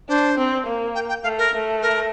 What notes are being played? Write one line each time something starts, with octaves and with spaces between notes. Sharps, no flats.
D4 C5
C4
A#3
G5
G5
A3 F5
A#4
A3
A#4